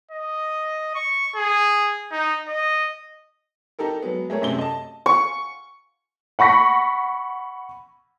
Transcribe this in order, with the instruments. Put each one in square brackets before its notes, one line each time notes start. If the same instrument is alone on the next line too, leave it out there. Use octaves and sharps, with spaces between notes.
[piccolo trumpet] D#5
C#6
G#4
D#4
D#5
[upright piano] D#4 G4 A4 A#4
F#3 G#3 B3
A3 G#4 A#4 C#5
F#2 C3 A3 C4 G7
D#5 A5
[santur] C#6
[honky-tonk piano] F#5 B5 C#6 A#6 B6